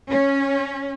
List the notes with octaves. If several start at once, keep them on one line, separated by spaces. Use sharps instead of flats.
C#4